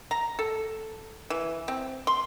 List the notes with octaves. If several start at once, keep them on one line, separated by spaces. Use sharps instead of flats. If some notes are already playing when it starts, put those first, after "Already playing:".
A#5
A4
E3
C4
C6